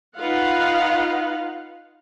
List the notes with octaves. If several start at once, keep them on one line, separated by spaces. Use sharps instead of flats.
D#4 F4 B4 F5 F#5